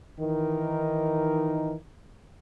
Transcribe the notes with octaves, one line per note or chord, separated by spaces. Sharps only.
D#3 E3 D#4 A#4